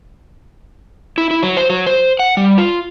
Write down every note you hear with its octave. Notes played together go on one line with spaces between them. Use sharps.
E4
E4
F#3
C5
F#3
C5
F#5
G3
F4